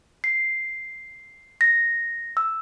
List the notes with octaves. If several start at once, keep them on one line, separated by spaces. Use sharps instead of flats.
C7
A#6
E6